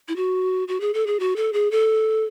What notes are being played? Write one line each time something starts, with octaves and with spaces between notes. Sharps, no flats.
E4
F#4
F#4
G#4
A4
G#4
F#4
A4
G#4
A4